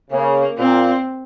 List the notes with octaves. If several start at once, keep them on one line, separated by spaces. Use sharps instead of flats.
C#3 A#3
A#2 C4